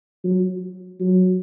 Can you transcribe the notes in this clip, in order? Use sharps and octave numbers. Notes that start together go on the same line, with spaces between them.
F#3
F#3